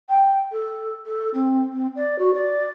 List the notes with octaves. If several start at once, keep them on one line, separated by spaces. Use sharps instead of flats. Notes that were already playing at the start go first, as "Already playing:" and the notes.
G5
A4
A4
C4
C4
D5
F#4
D5